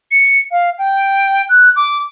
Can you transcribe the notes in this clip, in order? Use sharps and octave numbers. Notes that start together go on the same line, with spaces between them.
C#7
F5
G5
F#6
D6